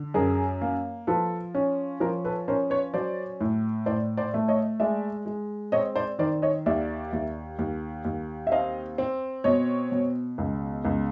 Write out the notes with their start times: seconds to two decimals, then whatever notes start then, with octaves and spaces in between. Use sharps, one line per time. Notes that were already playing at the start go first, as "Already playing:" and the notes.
Already playing: D3
0.14 F#2 G#4 A#4
0.62 A#3
1.07 F3 A4 B4
1.55 C#4
2.00 F3 A#4 C5
2.24 A4 B4
2.48 C#4 A#4 C5
2.70 B4 C#5
2.94 F#3 C5 D5
3.41 A2
3.86 A2 C5 D5
4.17 C5 D5
4.34 A3
4.48 C#5 D#5
4.80 G#3 D5 E5
5.26 G#3
5.72 C4 C#5 D#5
5.96 C5 D5
6.19 D#3 C5 D5
6.42 C#5 D#5
6.66 D#2 D5 E5
7.13 D#2
7.59 D#2
8.05 D#2
8.47 E5
8.52 C4 D#5 F5
8.98 C4
9.44 B2 C#5 D#5
9.92 B2
10.38 C#2
10.85 C#2